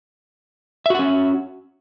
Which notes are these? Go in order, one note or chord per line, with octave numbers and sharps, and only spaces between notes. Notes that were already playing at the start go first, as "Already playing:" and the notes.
C#4 F#4 E5 F#5